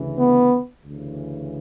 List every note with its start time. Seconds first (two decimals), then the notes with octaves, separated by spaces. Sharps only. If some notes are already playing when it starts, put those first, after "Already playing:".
Already playing: D2 C#3 E3
0.18 B3
0.85 D2 C#3 E3